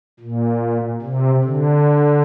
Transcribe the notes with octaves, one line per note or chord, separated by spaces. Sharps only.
A#2
C3
D3